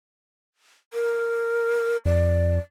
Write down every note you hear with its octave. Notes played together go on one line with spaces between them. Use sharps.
A#4
F2 D5